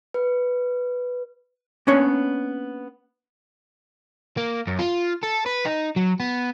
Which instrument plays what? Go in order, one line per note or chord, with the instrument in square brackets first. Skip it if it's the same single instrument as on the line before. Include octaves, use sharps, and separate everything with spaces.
[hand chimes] B4
[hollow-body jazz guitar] A#3 B3 C#4 D4 C#5
[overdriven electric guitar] A#3
F#2
F4
A4
B4
D#4
F#3
B3